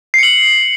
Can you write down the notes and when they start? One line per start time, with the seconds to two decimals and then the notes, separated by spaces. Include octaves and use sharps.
0.14 C7
0.18 C#7
0.23 F#7